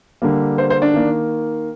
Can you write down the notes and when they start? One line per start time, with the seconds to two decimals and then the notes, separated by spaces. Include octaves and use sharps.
0.22 D3 G3 A#3
0.58 C5
0.70 C5
0.82 D4
0.94 D#3 A#3